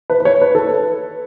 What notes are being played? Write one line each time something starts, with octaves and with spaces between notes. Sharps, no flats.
B4
B4
C#5
B4
A4
B4